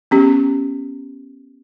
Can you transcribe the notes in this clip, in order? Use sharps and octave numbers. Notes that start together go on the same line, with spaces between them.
B3 C#4 G4